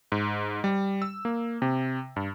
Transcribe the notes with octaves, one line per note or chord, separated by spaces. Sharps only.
G#2
G3
E6
A#3
C3
G2